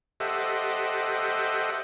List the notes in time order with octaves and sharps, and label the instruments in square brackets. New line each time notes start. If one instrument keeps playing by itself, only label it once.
[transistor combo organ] G4 A4 C5 D#5 E5 F#5